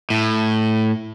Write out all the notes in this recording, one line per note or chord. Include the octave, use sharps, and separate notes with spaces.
A2